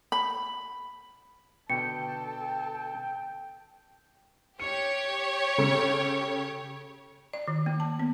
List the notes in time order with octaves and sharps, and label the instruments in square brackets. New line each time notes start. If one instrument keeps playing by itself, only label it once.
[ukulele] B5
[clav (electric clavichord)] B2 D3 [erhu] A4 [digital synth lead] G5 [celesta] C#7
[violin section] G4 C#5 [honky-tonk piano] C#7
[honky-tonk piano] C#3 A4
[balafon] D5
D#3
A#3
A5
B3